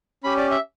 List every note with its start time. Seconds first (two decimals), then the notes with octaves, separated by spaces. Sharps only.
0.24 C#4 G4 B5
0.37 D5
0.51 E5